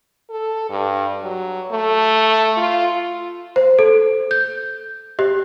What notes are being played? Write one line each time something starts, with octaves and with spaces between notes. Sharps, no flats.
A4
G2
F#3
A3
F4
C5
A4
G6
G4